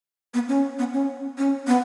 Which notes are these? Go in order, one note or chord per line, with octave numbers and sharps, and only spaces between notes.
B3
C#4
B3
C#4
C#4
B3